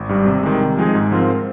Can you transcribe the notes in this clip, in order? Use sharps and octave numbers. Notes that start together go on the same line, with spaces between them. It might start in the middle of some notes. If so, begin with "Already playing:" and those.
Already playing: G#1
G2 G3
C3
D#3 G#3
C3
F3 G#3 D#4 G#4
G#2
F3 C4 F4 A#4